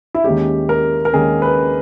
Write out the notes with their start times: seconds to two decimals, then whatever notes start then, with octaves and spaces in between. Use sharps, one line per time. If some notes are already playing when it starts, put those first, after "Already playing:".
0.15 E4
0.24 D#2 D#3 G#3 C#4 G4
0.69 A#4
1.05 A#4
1.13 D#2 D#3 G#3 C#4 G#4
1.42 B4